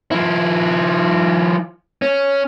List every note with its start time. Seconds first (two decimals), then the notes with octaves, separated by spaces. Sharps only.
0.11 F3 E4
2.02 C#4